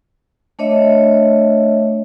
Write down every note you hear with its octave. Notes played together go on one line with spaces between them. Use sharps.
A3 D4 C#5 D#5 E5